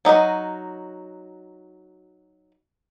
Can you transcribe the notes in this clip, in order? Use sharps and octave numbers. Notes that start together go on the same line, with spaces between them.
F#3 D#4 F#4 D#5